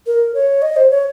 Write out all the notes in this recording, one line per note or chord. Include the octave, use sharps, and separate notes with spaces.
A#4
C#5
D#5
C5
C#5